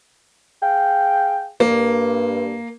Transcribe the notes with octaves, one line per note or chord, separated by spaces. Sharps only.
G#4 F5 G5
G2 A#3